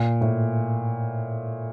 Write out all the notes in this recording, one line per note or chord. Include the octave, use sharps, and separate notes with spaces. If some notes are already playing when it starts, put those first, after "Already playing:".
Already playing: A#2
A2